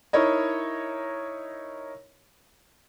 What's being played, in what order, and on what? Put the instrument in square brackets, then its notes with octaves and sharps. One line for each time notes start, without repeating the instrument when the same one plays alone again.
[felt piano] D#4 E4 A#4 C#5 D#5